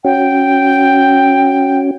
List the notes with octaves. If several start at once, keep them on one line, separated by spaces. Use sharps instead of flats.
C#4 F#4 G5